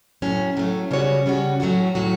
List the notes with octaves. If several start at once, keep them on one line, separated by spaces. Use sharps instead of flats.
A2 F#3 A3 C#4
A2 F#3 A3 C#4
C#3 G3 C#4 F#4 C#5
C#3 G3 C#4 F#4 C#5
A2 F#3 A3 C#4 F#4
A2 F#3 A3 C#4 F#4